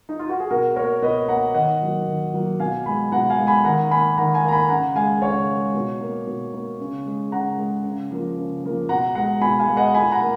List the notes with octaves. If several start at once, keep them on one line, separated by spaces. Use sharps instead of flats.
D#4
F4
F#4
G#4
B2 F#4 A#4
A#3 A#4 C#5
B2 B4 D#5
A#3 F#5 A#5
D#3 D#5 F#5
F#3 A#3
D#3
F#3 A#3
B2 F5 G#5
G#3 G#5 B5
B2 F#5 A#5
F5 G#5
G#3
G#5 B5
D#3 F#5 A#5
A#3 G#5 B5
D#3 F#5 A#5
F5 G#5
A#3
A#5
G#5 B5
C#3 F#5 A#5
G#3 F5 G#5
C#3 C#5 F5
G#3
B2
A#3
B2
A#3
C#3
G#3
C#3 F#5 A#5
G#3
C#3
F3 A#3
C#3
F3 A#3
B2 F#5 A#5
G#3 F#5 A#5
B2 G#5 B5
F5 G#5
G#3
D#5 F#5
A#2 G#5 B5
F#5 A#5
A#3